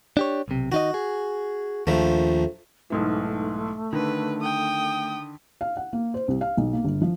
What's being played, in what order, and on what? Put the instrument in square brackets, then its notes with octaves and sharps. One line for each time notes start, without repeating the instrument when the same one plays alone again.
[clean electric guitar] D4 G4 C#5
B1 C3
[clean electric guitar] D#3 D#4 D#5 [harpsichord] F#4
[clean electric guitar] G#4
[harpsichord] A#1 F3 A3 [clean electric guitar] D#2
[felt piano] B1 G#2 E3 [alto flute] A3
[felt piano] D3 D#3 [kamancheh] B4
[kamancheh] G5 D#6
[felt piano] F5
F#5
A#3
C5
C2
F5
B1
A#3
G1
F3